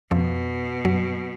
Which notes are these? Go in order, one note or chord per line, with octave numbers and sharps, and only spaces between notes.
F2 B2 F3
F#2 F#3